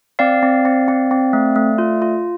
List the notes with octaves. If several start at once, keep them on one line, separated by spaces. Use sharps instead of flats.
C4 D5 F5
C4
C4
C4
C4
A3
A3
F4
F4